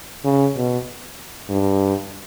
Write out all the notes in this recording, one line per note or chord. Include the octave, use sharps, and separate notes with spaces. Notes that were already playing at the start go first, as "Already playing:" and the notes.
C#3
B2
G2